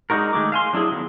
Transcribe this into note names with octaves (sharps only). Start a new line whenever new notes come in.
G#3 D4 D#4 F#4 A#4
D#3 G#3 A3 D6
F5 G#5 C6
F#3 D4 E4 G#4
D#3 B3 D4